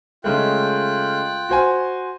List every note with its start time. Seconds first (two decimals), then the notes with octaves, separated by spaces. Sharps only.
0.24 C#3 G#3 A3 F4 G5 F#6
1.49 F#4 C5 G#5